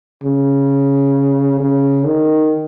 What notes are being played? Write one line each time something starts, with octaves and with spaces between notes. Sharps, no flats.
C#3
C#3
D#3